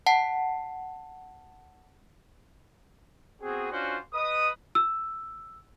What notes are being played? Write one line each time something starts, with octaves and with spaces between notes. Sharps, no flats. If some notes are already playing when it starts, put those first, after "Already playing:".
F#5 A5 C7
B3 C4 F#4 G#4
C#4 D4 F4 F#4 C5
B4 D#5 D#6
E6